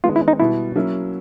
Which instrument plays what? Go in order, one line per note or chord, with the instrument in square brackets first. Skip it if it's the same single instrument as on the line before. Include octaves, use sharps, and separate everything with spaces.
[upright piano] D#3 G#3 B3 [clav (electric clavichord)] F4
[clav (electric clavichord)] E4
D#4
[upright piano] B2 G3 B3 [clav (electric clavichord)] E4
[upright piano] F#3 A#3 C#4 E4